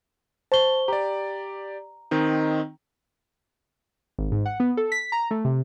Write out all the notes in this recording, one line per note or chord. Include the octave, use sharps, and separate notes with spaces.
C5 A5 C#6 G7
G4 D5 A#5
D#3 C4 D#4
G#1
G#2
F#5
B3
A4
B6
A#5
A3
C3